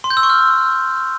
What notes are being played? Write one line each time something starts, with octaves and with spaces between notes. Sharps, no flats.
C6
G6
E6
C#6
F6